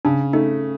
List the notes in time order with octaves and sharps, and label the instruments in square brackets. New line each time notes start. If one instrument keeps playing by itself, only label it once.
[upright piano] C#3 [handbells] D4
[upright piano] A3 [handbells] D#4